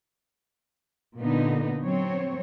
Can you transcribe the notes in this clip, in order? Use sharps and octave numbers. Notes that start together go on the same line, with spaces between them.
A#2 D3 B3 D#4
F#3 C4 C#5